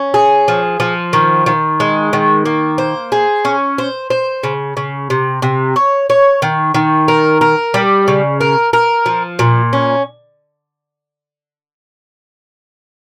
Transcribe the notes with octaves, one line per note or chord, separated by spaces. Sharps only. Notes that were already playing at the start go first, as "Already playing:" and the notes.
Already playing: C#4
G#4
F3
F3
D#3
D#3
G#3
D#3
A#3
C5
G#4
C#4
C5
C5
C#3
C#3
C3
C3
C#5
C#5
D#3
D#3
A#4
A#4
G3
C#3
A#4
A#4
F3
A#2
C#4